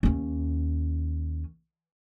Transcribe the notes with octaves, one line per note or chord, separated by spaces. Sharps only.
D#2 C#4